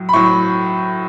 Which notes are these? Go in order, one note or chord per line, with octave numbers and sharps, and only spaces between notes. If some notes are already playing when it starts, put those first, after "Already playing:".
Already playing: A2 F#3
B5
A2 F#3 C#6